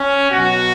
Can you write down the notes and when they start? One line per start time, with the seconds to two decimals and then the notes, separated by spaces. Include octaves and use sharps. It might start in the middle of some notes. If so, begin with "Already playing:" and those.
Already playing: C#4
0.31 B2 F#3 F#4